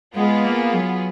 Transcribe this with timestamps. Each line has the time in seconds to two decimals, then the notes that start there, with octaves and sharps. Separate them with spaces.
0.14 G#3 B3 F4 G#4
0.44 A#3
0.74 F#3